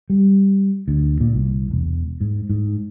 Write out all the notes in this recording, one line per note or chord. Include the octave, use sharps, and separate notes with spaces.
G3
D2
A#2
C2
E1
G#2
G#2